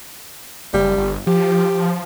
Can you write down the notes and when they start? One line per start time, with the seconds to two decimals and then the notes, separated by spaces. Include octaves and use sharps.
0.74 F#1 G3
0.98 G1
1.27 F3 G4